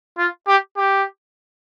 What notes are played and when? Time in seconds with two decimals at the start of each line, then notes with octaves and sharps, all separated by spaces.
0.18 F4
0.47 G4
0.77 G4